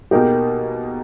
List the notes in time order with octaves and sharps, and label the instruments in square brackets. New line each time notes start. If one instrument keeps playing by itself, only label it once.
[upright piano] B2 A#3 D#4 G#4 [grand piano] G4 A#4